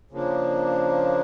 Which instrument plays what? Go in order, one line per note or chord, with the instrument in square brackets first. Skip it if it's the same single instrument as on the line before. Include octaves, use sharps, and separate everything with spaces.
[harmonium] C#3 F3 A#3 D4